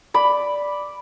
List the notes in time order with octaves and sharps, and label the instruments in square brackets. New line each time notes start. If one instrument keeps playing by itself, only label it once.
[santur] D5 B5